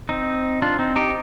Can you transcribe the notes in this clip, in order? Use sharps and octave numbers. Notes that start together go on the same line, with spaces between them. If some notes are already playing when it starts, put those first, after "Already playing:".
C4 D#4
D4 F4
C4 D#4
D#4 G4